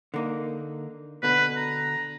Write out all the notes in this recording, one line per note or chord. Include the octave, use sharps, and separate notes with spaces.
D3 A#3 D#4
B2 D3 B4
A#5